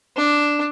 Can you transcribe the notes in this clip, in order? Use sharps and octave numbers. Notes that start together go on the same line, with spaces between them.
D4